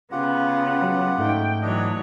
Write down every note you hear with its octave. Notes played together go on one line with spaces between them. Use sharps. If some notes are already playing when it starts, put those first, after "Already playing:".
C#3 B3 F4 G4 F#5
F#3
G#2 A3 D#4 G5
E3 F#3 D4 C#5 D#5